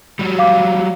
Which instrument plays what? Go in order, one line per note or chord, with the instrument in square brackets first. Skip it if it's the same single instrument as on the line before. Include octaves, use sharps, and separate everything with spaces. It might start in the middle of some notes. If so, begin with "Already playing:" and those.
[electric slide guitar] F#3 G3
[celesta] F5 D6